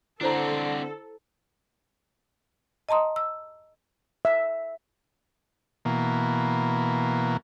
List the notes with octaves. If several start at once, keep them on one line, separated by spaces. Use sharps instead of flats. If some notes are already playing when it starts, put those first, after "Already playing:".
D3 C4 D4 E4 A4 C5 A#5
D#5 A5 A#5 C6 D#6
E6
E5
B2 E3 A#3